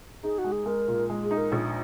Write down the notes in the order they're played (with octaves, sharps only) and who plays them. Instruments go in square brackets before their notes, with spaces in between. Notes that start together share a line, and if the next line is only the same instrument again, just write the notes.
[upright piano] D#4 [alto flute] G#4
[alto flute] F#4
[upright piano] G#3
[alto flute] G#4
[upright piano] G#3 [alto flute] A#4
[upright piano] A#2
G#3
[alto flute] G#4
[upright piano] D#4
[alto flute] A#4
[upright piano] A#1